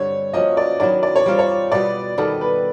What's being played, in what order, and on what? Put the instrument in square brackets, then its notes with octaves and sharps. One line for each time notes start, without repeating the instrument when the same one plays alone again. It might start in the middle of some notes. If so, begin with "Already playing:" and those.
Already playing: [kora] G2 D3 G3 C4 [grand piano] C#5
[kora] F3 A#3 C#4 F#4 [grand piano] D#5
[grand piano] D5
[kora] D#3 F#3 B3 E4 [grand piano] D5
[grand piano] D5
C#5
[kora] G3 C4 F4 A#4 [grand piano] C5
[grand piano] C#5
[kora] B2 G3 B3 [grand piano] D5
[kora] D#3 G3 B3 [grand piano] A4
[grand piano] B4